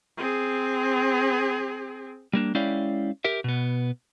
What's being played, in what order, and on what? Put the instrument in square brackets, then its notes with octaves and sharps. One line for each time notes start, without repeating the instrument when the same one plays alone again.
[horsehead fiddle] C4 G#4
[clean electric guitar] G3 A#3 D4
G#3 C#4 E4 D5 F5 G5
G4 A#4 E5
B2 B3